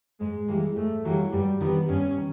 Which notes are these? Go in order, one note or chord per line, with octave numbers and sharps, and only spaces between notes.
G#2 G#3
E3 G3 G#3 A#3
G#2 A3
E3 F#3 G3 A#3
G2 G3
D#3 G3 B3 C4
G2 C#4
D#3